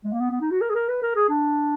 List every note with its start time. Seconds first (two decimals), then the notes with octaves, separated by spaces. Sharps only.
0.04 G#3
0.13 A#3
0.21 B3
0.31 B3
0.41 D#4
0.51 F#4
0.61 A#4
0.70 G#4
0.75 A#4
0.89 B4
1.03 A#4
1.16 G#4
1.29 D4